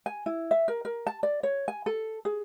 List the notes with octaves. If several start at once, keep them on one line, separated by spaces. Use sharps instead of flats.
G#5
E4
E5
A#4
A#4
A5
D5
C#5
G#5
A4
G#4